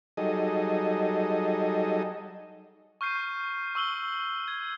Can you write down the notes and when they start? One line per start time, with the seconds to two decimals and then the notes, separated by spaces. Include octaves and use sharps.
0.17 F#3 G3 D#4 G#4 A4 D#5
3.01 C#6 F6 G6 C7 D#7
3.75 C#6 E6 F#7 G7
4.48 G#6